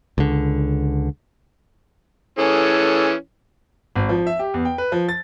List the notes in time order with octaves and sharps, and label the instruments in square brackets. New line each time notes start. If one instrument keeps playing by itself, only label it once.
[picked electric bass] C#2 D3
[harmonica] E3 C#4 [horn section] G#4 A4
[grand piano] G#1
F3
E5
G4
E2
G5
B4
F3
A6